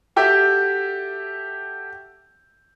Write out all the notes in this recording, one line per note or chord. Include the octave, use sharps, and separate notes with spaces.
F#4 G4 A4 E5 G5